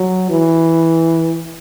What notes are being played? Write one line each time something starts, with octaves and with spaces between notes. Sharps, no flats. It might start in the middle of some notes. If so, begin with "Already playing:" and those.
Already playing: F#3
E3